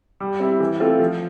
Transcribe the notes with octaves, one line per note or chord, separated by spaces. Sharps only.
G3
C4 E4 G4
E3
A3 C4 F4 A4
F3